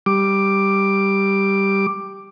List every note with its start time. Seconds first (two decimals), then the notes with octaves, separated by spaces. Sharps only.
0.06 G3 D6